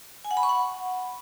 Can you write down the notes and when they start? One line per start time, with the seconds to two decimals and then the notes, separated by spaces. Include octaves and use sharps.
0.25 G#5
0.31 F#5
0.37 B5
0.43 C#6
0.49 F#5